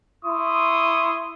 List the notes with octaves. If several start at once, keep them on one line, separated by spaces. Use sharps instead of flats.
E4 C6 C#6 D#6